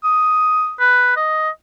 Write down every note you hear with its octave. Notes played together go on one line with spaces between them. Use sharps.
D#6
B4
D#5